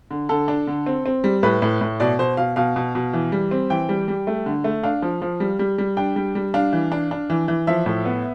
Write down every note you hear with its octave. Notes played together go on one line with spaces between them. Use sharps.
D3
D3 A4
D4
D3
C4
C4
G3
A2 B4
A2
A2
B2 D5
B2 C5
B2 F5
B2 F5
B2
B2
E3
G3
C4
E3 G5
G3
G3
A3
D3
A3
D4 F5
F3
F3
G3
G3
G3
D4 G5
G3
G3
D4 F5
E3
D4
D4
E3
E3
F3 E5
A2
B3